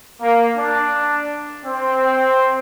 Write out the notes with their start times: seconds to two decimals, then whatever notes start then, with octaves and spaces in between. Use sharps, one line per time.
0.22 A#3
0.57 D4
1.65 C4